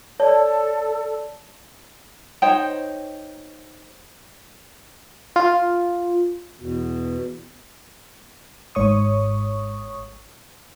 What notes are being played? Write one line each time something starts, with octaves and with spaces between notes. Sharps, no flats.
A4 C#5 D5 A5
D#4 C5 C#5 G5
F4
E2 B2
G#1 G#2 C#5 C#6 D#6